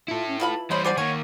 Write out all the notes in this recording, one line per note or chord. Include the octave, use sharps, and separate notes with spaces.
E4 F4 A4
C#4
E3 F4 A5 B5
E3 G3 C5 C#5 D#5 B5
G4 C5 D5 F#5 G#5
D#3 A#3 C#5 G#5